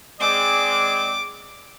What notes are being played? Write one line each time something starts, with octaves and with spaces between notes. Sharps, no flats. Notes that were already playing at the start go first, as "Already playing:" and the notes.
G#3 C4 D5 D6